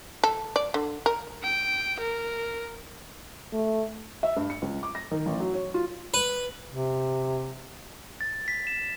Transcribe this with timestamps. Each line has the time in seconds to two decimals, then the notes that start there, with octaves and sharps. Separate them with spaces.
0.24 A4
0.56 D5
0.74 D3
1.06 A#4
1.43 G5
2.00 A#4
3.52 A3
4.23 E5
4.37 G2
4.50 C#7
4.62 C#2
4.83 D6
4.95 A#6
5.11 D#3
5.26 A1
5.40 F#3
5.54 C#5
5.74 F4
6.14 B4
6.68 C3
8.21 A6
8.48 B6
8.67 E7